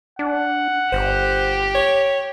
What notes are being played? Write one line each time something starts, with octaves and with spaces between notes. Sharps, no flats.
D4 F#5
G1 G4 C5
C#5